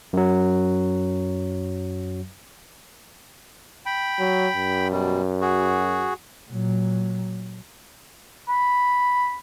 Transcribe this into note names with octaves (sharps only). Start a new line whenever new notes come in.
F#2 F#3
G5 B5
F#3
F#2
B2 G3
F#4 G#4
A#2 F#3
B5